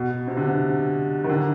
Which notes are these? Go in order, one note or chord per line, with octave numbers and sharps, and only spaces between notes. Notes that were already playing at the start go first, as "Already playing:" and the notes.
Already playing: B2
C3
D3
C3
D#3
D3